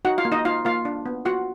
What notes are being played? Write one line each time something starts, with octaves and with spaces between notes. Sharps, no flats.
D#4 F#4 F#5
F4 F5
A#3
D#4 D#5
D#4 F4 F5
A#3 F4 F5
D4
B3
F4 F#4 F#5